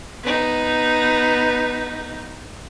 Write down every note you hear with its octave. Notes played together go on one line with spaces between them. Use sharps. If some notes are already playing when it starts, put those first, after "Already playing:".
B3 D#4